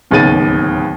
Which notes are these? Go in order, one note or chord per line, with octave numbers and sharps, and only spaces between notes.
D1 D#2 C#3 B3 A6 D#7